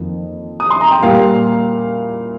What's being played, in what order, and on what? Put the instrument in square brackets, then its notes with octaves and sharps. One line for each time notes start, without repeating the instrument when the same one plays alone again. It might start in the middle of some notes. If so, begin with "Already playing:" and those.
Already playing: [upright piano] F2 D#3 A#3
D#6
C6
A#5
G5
A#2 G3 A#3 F5